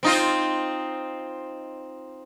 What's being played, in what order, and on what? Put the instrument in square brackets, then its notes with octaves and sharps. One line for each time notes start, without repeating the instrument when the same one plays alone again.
[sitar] C4 D#4 F4